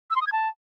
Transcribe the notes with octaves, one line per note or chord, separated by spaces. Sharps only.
E6
C6
D#6
G#6
A5